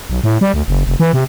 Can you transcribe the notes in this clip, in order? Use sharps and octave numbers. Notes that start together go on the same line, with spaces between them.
B1
A2
G3
D2
F#1
F1
E3
C3